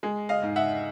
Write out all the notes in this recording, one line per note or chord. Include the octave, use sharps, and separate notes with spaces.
G#3
D#5 F5
G#2
E5 F#5